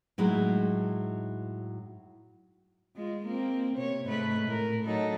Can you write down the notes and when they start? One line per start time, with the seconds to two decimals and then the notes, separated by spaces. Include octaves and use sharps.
0.18 A2 F#3 G#3 D#4 E4
2.96 G#3 F4
3.26 A#3 C4
3.77 C3 C#5
4.06 G#2 A3 B4
4.46 A2 A#4
4.84 F#3 D#4 A4